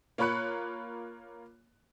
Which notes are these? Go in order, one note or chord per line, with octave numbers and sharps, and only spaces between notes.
A#3 F4 C#5 B5 F#6 C#7